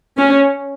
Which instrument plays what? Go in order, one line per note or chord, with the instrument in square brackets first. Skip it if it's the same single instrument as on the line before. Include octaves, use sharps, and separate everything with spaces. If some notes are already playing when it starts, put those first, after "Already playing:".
[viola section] C#4